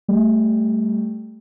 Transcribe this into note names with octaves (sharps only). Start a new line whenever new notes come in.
G3 A3